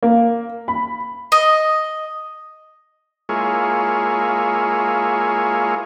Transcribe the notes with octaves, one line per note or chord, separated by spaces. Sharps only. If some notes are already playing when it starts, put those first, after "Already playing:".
A#3
B5
D#5
G#3 A#3 E4 F4 G#4 C#5